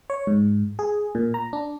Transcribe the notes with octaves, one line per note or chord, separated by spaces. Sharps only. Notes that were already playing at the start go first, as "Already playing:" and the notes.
C#5
G#2
G#4
A#2
A#5
D4